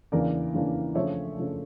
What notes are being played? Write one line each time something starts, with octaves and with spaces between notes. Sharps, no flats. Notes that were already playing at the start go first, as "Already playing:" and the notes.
E2 C#3 E3 A#3 D4 A#4 D5
E2 C#3 E3 A#3 D4
C#3 F3 A3 D4 C#5 E5
C#3 F3 A3 D4